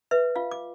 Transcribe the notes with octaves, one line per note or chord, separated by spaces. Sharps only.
B4 E5
F4 F5
D6